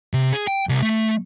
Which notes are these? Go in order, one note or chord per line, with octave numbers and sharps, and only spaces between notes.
C3
G#4
G5
C2
A3